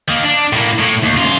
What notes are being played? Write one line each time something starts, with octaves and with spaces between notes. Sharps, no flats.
D#3 A#3
D4
A2 A#3
A2
D#2
F#2 F4